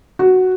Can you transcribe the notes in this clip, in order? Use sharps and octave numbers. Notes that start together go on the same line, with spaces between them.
F#4